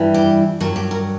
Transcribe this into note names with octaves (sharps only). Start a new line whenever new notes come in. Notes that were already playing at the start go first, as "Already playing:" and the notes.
Already playing: G2 E3 G3
G4
G2 F#3 A#4
G4
A#4